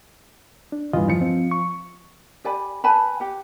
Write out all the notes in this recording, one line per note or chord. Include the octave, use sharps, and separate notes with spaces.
D4
E2 G2 F4 D#5
F3 C#7
C4
C#6
G4 D5 G#5 B5
B4 G#5 A5 B5
G4 F#5